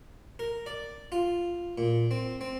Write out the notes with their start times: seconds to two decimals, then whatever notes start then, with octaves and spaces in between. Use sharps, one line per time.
0.39 A#4
0.66 D5
1.12 F4
1.78 A#2
2.11 C4
2.41 C4